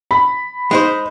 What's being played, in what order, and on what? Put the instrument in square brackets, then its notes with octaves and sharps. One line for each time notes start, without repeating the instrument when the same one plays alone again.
[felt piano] B5
[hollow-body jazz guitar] G#3 D#4 C5